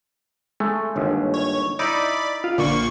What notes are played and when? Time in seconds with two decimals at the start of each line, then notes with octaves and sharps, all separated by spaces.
0.60 G#3 A3
0.96 G1 D#2
1.34 C#5
1.79 D#4 E4 D5 B5 D7
2.44 F4
2.58 A#1 D3 A#3 C#6